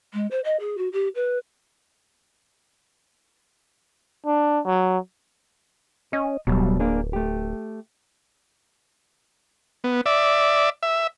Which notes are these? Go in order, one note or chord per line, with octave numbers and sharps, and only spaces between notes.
G#3
C5
D#5
G#4
F#4
G4
B4
D4
F#3
C#4 D#5
D1 B2 F#3 G3
A#3 D4 G#4
A3 G4
B3
D5 E5
E5